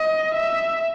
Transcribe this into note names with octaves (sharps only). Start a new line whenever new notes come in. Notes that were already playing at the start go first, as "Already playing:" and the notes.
Already playing: D#5
E5